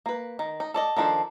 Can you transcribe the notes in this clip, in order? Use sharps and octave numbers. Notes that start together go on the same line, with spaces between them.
A#3 B4
D#3
D#4
A4 D5 D#5
D#3 F3 D4 A4 C5